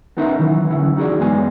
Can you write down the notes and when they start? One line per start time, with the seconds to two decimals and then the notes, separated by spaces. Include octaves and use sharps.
0.17 B3 C#4 D#4 A#4 B4 E5
0.39 D#3 E3 F#3
0.70 D3 E3 C#4 E4
0.97 D#4 F#4 G#4 D5
1.19 F#2 G#3 B3 G#5